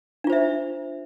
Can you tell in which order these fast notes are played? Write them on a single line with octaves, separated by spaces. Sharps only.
D4 F4 C5 E5